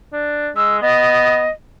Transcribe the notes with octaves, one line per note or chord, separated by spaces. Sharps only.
D4
G#3 E6
B3 D#5